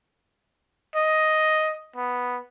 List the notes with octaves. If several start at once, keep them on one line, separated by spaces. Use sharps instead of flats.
D#5
B3